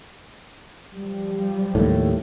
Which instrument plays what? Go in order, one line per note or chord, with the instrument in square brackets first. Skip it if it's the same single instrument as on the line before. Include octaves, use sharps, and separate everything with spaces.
[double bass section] F3 G3
[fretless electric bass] D#2 A2